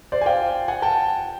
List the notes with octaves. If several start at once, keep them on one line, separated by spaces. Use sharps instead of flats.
C5 D5
G#5
F5 G5
F#5 G#5
G5 A5